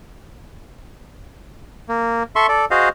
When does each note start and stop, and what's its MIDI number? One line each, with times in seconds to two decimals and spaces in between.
1.89 2.23 58
2.36 2.47 69
2.36 2.47 76
2.36 2.47 84
2.36 2.47 85
2.48 2.65 69
2.48 2.65 74
2.71 2.89 66
2.71 2.89 68
2.71 2.89 72
2.71 2.89 75
2.71 2.89 77